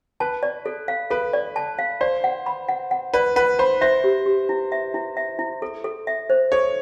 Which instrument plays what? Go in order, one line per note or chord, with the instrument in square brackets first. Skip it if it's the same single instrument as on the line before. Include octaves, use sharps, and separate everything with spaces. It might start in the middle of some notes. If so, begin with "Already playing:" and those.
[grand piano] B4 [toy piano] A5
[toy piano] D5
A4
F5
[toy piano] A4 [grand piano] B4
[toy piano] D5
A5
F5
[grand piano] C5 [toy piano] D5
[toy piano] F#5
B5
F#5
F#5
[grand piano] B4 [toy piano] D5
[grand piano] B4 [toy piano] F#5
[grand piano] C5 [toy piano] B5
[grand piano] C5 [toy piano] E5
[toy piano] G4
G4
E4
E5
E4
E5
E4
A4
A4
E5
C5
[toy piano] A4 [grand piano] C#5